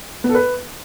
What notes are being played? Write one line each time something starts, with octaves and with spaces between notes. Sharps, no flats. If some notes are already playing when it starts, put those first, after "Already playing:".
B3
A4
B4